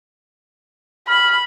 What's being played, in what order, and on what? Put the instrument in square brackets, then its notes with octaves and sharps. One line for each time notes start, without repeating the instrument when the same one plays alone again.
[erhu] B5 [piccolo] F6